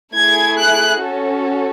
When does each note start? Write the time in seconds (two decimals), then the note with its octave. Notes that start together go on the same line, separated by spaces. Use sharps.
0.14 A3 E4 G#4 G#6
0.58 F#6
1.02 C#4 F#4 A4